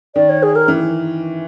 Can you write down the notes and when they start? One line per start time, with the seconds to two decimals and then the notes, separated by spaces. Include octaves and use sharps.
0.15 D#3 D5
0.29 C#5
0.42 G#4
0.55 A#4
0.68 E3